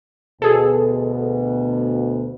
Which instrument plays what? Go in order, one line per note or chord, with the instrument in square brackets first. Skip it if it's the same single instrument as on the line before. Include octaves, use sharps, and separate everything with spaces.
[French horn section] D2 B2 [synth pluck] G#4 A4